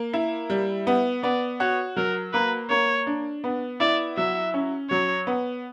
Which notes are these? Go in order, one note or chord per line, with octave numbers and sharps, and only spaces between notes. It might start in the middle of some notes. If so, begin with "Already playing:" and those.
Already playing: A#3
E4
G3
B3
B3 D5
F#4 C#5
F#3 A#4
A#3 B4
A#3 C#5
D4
B3
E4 D5
F#3 E5
C#4
F#3 C#5
B3